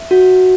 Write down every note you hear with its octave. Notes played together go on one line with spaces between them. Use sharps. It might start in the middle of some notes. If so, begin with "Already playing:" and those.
Already playing: E5
F#4